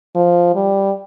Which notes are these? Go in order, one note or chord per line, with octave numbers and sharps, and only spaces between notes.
F3
G3